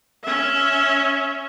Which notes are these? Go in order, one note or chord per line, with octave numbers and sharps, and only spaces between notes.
C#4 E5